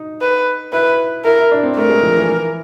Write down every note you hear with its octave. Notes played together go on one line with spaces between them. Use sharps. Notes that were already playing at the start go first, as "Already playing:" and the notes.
Already playing: D#4
B4
E4 B4
E4 A#4
E4
D4
C4
A3 A#4
G#3
F3
E3
E3